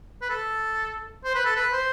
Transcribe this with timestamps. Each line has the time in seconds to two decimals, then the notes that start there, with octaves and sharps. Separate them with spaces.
0.22 B4
0.29 A4
1.24 C5
1.35 B4
1.45 A4
1.56 B4
1.72 C5